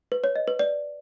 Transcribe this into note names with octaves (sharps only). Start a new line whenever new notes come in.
B4
C#5
D#5
B4
D5